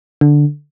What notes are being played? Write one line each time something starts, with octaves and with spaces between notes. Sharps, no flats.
D3